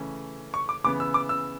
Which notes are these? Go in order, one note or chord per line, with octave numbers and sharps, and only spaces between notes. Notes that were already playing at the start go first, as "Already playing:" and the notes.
Already playing: C#3 E3 A3 C#4
C#6
D6
C#3 E3 B3 D6
E6
D6
E6